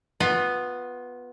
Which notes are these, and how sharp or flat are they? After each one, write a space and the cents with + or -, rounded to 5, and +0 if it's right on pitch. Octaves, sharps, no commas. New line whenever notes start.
B3 +0 F4 +25